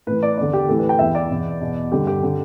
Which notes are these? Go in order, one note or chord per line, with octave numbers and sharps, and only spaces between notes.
A2 E3 B4
D5
E2 D3 D5
G4
A2 E3 A4
B4
G5
E2 E3 E5
D5
E2 B2
E2 B2
G2 D3 G4
G4
D3